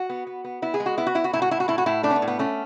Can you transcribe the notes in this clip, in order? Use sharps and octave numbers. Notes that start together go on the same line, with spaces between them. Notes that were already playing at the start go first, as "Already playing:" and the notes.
Already playing: F#4
B3
B3
B3
B3 E4
G#4
G#3
F#4
B3 E4
F#4
B3 E4
F#4
A2 E4
F#4
A2 E4
F#4
A2 E4
F#4
A2 E4
A3 D4
C#4
B3
A2
B3
A3 C#4